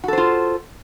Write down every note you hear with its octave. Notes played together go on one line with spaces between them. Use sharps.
F4 F#4 A4 C5